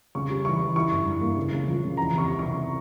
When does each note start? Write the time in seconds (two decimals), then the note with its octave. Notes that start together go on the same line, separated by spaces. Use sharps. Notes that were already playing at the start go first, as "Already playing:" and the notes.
0.15 C#3 C#6
0.30 G3
0.45 E3 C#6
0.60 E3
0.76 E4 C#6
0.91 G2
1.06 G2
1.21 A#3
1.37 C#3
1.52 C#3
1.68 F3
1.83 C#3
1.97 E3 A#5
2.13 C3 C#6
2.28 C3
2.39 C3 C#6